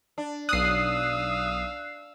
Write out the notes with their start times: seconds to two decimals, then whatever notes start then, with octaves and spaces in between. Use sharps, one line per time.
0.18 D4
0.49 B1 F5 D#6 E6 F#6 C7